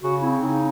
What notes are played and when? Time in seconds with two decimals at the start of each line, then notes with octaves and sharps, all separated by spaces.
0.02 C#3 F#4
0.22 C4 E4
0.40 C#3 D#4